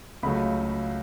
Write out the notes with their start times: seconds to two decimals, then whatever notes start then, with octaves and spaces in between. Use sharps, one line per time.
0.23 C#2 C#3 F#3 A3 B5